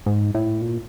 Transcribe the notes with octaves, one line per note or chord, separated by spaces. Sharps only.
G#2
A2
A#2